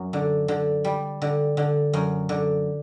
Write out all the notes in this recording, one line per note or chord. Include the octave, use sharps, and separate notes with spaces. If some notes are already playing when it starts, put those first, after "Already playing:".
Already playing: F#2
D3
D3
G3
D3
D3
F#2
D3